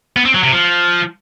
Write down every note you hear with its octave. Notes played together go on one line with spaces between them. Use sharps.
B3
C4
F#3
C3
F3